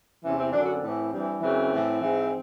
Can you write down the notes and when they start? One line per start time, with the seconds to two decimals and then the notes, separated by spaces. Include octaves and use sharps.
0.23 E2 C3 E3 C#4
0.37 C4
0.52 F#2 D4
0.57 D3
0.63 F#4
0.73 C4
0.82 A2 E3
1.11 G2 E3
1.42 F#2 C#3 E3 C4
1.72 A2 E3
2.01 G#2 E3